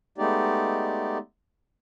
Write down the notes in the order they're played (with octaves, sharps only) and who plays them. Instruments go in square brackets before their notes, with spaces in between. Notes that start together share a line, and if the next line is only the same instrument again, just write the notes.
[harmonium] G#3 A3 B3 D#4 G4 D5